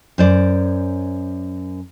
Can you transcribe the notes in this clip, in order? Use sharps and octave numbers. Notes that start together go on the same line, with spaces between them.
F#2 C5 D5